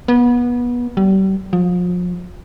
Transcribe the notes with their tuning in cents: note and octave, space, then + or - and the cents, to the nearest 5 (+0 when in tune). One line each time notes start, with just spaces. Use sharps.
B3 -25
G3 -35
F3 +35